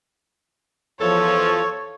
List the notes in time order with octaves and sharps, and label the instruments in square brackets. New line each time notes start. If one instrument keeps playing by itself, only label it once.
[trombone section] E2 F3 [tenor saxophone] A4 [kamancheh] C#5